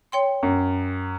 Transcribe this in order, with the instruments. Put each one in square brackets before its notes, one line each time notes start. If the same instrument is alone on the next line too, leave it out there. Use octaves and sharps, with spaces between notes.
[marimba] C#5 G5 C6
[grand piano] F#2